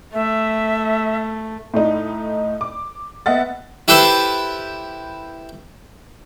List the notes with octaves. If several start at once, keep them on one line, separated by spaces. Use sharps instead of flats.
A3 E5
A2 A3 D#4
D6
B3 D#5 E5 F#5 A6
E4 G4 A4 B4 C5 E5